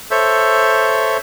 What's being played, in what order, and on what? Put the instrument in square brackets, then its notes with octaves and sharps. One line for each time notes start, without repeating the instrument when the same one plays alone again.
[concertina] A4 C5 C#5 E5